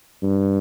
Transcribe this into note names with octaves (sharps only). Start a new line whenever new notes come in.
G2